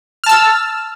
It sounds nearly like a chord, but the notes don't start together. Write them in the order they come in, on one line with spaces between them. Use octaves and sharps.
F6 A5 E6